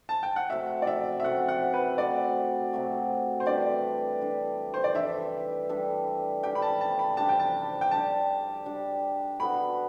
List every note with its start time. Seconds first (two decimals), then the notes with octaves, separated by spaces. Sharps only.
0.09 A5
0.23 G5
0.36 F#5
0.50 C3 F#3 A3 E5
0.82 D5
0.87 E5
1.20 E5
1.24 C3 F#3 A3 F#5
1.48 F#5
1.74 B4
1.98 C3 F#3 A3 D5
2.73 C3 F#3 A3
3.40 C5
3.46 E3 G3 D4 A4 D5
4.21 E3 G3 D4 A4
4.74 C5
4.84 D5
4.95 E3 G3 D4 A4 E5
5.69 E3 G3 D4 A4
6.43 G3 D4 G4 G5
6.55 B5
6.62 A5
6.81 A5
6.99 B5
7.17 G3 D4 G4 A5
7.29 G5
7.40 A5
7.81 G5
7.91 G3 D4 G4 A5
8.65 G3 D4 G4
9.40 F#3 B3 F#4 A4 B5